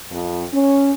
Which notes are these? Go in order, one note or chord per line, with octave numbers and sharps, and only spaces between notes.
F2
C#4